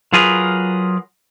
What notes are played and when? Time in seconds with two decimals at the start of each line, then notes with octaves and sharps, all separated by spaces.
0.13 F#3 F4 G#4 A#4 B4